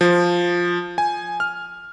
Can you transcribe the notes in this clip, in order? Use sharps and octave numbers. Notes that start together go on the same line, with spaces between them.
F3
G#5
F6